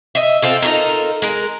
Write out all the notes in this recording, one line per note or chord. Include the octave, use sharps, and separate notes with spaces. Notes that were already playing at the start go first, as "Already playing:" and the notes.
D#5 E5
C4 F4 A4
D#4 F4 A4 A#4
G#3 A#4